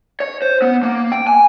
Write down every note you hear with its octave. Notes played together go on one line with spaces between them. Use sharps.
C#5
C5
B3
A#3
G5
G#5